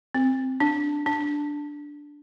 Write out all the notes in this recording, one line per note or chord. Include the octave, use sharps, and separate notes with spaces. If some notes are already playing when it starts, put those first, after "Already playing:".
C4
D4
D4